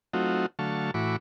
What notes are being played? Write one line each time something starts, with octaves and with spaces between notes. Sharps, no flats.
F#3 A3 C4 D#4 F4 F#4
D3 F#3 A3 F5 A5 C#6
A2 E3 F#4 B5 C#6 D6